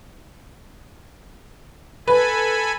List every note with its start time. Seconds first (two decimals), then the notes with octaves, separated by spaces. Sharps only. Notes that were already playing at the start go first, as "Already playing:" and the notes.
2.08 A4 B4 G#5 B5